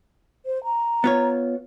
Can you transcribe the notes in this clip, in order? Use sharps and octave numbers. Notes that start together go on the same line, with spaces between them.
C5
A#5
B3 F4 C#5